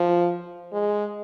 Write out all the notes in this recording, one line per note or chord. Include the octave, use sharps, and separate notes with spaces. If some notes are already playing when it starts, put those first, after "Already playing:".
Already playing: F3
G#3